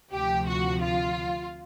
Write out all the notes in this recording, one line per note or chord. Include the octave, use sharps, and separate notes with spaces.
D2 C3 F3 G4
F#4
F4